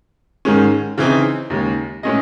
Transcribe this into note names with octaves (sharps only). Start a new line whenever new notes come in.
G#2 D#3 G#3 C#4
C#3 E3 C4 D#4
D#2 C#3 G#3
A2 G#3 C#4 G#4 D#5